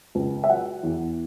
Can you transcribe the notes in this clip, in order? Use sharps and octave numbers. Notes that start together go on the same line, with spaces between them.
C#2
E5
F#3 F#5
E2